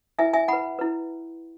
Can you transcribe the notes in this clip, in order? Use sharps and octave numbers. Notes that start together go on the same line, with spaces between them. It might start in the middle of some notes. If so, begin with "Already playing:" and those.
E4 B4 E5 G#5
E5 G#5
E4 B4 F#5 B5
E4 B4